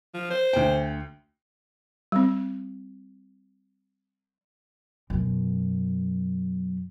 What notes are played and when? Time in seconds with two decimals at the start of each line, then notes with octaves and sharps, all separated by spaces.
0.14 F3
0.30 C5
0.53 D2 G5
2.12 G3 C4
5.10 F#2 B2